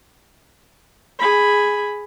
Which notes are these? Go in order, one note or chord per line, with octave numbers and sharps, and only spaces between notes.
G#4 B5